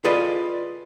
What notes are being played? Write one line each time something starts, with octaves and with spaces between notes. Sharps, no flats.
F4 G#4 A4 B4 D5 D#5